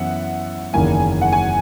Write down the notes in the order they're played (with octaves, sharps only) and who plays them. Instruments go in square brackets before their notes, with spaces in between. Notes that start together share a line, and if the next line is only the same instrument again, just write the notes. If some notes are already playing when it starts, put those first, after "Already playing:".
Already playing: [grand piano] F#2 E3 B3 [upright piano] E5 F#5
[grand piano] F#1 E2 D#3 A#3 E4 [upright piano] G#5
[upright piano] F#5
G#5